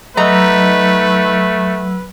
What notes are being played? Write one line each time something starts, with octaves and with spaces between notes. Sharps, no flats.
F#3 A3 D#4 B4 A#5 E6